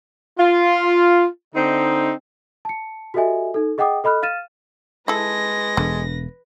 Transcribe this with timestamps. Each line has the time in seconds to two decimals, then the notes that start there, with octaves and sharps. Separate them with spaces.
0.37 F4
1.54 D3 C4 D#4
2.65 A5 C#7
3.14 F#4 G4 A4 D#5 E5 G#5
3.54 D#4 A4
3.78 G#4 D#5 F#5 G5 D6 D#6
4.04 A4 D#5 B5 F6 F#6
4.22 F5 F6 A6 D#7 E7
5.08 G#3 E4 A4 B4 A#6
5.77 E1 D3